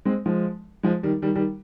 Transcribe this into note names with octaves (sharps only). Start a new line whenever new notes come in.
G#3 C4
F3 G#3
F3 G#3
D#3 G3
D#3 G3
D#3 G3